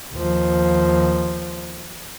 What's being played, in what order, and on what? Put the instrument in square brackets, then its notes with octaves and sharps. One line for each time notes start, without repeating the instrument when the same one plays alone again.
[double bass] D#2 F3